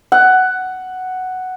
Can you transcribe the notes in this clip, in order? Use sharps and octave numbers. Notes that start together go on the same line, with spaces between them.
F#5